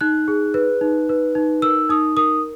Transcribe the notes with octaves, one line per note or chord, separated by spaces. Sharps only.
D#4 F#6
G#4
B4
D#4
B4
D#4
A#4 E6
D#4 D#6
A#4 D#6